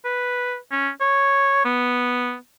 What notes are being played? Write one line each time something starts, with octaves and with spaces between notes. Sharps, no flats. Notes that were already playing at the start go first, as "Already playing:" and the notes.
B4
C#4
C#5
B3